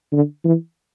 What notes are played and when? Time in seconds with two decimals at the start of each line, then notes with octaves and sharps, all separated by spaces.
0.12 D3
0.44 E3